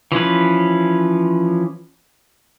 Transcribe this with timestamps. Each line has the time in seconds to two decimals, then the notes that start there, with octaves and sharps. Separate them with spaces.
0.12 E3 F3 C#4 B4